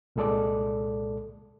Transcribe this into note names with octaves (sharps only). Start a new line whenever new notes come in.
C2 A#2 G#3 A4 D5